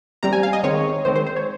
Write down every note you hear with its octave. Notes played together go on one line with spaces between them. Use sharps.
C3 G3 C4 A#5
G#5
F5
D#5
D#3 G#3 C4 C#5
D#3 G#3 C4 C5
C5
C5
C#5